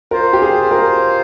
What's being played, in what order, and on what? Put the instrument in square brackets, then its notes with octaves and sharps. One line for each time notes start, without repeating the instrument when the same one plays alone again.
[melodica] F4 C5 F5 [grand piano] A#4
[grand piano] G4
G#4
A#4